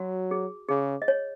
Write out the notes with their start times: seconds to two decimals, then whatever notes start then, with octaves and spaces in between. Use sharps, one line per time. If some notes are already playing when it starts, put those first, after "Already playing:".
Already playing: F#3 F#4
0.31 G#4
0.69 C#3 G#4
1.02 D#5
1.08 C#5